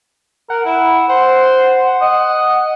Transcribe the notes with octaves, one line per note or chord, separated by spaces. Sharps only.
A#4 F#5
E4
C5 F#5
D#5